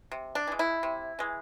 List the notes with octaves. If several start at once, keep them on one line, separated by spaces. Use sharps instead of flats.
C3
D4
E3 G#3
E4
C3
E3 G#3